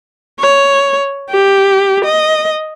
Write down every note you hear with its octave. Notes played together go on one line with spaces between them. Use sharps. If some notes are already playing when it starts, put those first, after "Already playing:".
C#5
G4
D#5